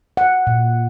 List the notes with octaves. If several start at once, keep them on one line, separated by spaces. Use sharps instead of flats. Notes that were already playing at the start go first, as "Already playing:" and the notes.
F#5
A#2